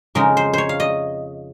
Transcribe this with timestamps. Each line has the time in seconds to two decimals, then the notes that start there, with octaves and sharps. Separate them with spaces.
0.15 F2 C#3 G#3 D#4 A#4
0.37 C5
0.53 C5 C#5
0.69 F5
0.80 D#5